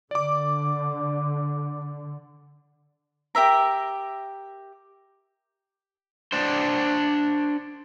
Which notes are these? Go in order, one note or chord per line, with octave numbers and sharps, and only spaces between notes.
D3 D5 D6
G4 A#4 E5 A#5
D4 C5